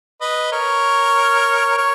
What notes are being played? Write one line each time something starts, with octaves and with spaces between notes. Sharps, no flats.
B4 D#5
A#4 C#5
A#4 C#5